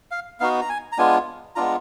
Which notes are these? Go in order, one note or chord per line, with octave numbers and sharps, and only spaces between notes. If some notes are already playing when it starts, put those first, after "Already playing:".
F5
B3 D#4 F#4 F5
A#5
G#5
A#5
G#3 B3 D4 F4 G#5
G#3 B3 D4 F4 A#5